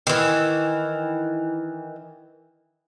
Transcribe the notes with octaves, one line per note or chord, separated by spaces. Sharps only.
D#3 E3